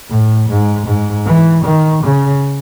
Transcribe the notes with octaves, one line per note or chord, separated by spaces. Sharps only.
A2
G#2
G#2
E3
D#3
C#3